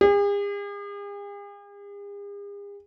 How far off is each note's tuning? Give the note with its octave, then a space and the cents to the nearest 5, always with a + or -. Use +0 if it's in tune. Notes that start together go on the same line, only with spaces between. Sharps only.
G#4 -45